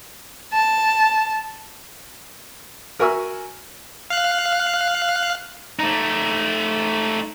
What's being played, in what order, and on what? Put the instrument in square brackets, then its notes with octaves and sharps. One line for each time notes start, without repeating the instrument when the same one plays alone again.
[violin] A5
[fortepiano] F#4 A#4 E5 G#5 C#6 E6
[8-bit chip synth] F5 F#6
[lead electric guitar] A3 D#4